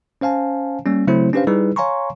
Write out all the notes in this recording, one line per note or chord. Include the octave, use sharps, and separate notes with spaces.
C#4 C5 F5 G#5 A5
G3 A#3 C#4
C#3 F#3 A3 C4 E4 C5
C#4 D4 G4 B4 C5 F5
G3 D#4 E4 G#4 B4
C#5 F5 G#5 A#5 C6 C#6